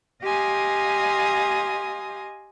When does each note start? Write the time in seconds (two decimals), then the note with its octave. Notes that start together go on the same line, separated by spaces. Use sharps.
0.22 G4 D#5 F5 G#5 C6 D#6